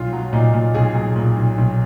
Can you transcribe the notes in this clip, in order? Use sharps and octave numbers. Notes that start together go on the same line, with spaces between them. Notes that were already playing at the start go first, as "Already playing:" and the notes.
Already playing: B1 F4
F#3
A#2 D#4
A#2
B1 G#4
B1
A#2
B1
B1